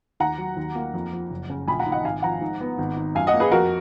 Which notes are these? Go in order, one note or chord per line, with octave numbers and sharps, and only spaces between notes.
D#2 F#5 A#5
F#3
D#2
A#3
F2
F3
F#1
C#3
A#1 G#5 B5
F#5 A#5
D#3
D#5 F#5
G#1 F5 G#5
F3 F#5 A#5
G#2
B3
G#1
D#3
F#2 F5 G#5
D#5 F#5
A#3
G#4 B4
F2 F#4 A#4